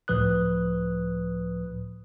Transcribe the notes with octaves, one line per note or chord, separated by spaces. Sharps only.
C#2 A2 F3 B4 D#6 F#6